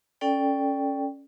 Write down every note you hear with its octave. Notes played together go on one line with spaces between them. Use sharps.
C#4 A4 D5 G5